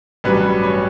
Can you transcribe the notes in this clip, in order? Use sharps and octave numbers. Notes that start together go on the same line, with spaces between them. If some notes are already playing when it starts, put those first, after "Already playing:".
A1 G2 F#3 B4
C#5